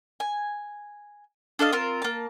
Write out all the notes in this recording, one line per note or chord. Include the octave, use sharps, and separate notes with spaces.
G#5
D4 A4 D#5 F5
C4 F4 A#4
A#3 A5